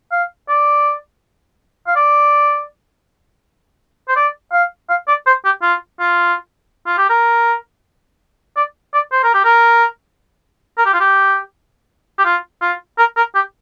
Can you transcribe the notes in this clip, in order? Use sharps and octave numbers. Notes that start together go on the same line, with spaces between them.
F5
D5
F5
D5
C5
D5
F5
F5
D5
C5
G4
F4
F4
F4
G4
A#4
D5
D5
C5
A#4
G4
A#4
A#4
G4
F4
G4
G4
F4
F4
A#4
A#4
G4